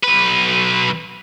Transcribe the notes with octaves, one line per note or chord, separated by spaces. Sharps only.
B1 B4